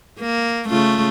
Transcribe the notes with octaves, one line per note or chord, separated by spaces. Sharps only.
A#3
C#3 A3 F4